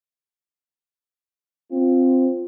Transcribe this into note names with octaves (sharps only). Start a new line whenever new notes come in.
C4 F4